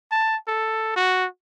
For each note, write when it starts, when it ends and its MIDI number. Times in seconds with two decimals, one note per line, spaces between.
0.11 0.36 81
0.47 0.92 69
0.96 1.27 66